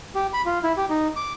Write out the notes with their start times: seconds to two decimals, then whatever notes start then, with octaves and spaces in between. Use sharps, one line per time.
0.15 G4
0.33 B5
0.45 F4
0.63 E4
0.77 G4
0.90 D#4
1.16 D6